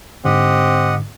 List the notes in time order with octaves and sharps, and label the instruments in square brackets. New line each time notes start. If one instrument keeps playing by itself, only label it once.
[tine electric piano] G#2 D3 [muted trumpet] C4 [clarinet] G4 [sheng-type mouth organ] D#5 F#5